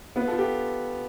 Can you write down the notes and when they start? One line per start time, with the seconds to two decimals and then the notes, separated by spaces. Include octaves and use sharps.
0.16 B3 F4
0.28 F4 A4
0.38 G4